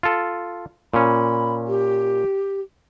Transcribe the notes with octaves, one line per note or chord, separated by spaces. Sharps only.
F4 A4
A#2 C#4 B5
G4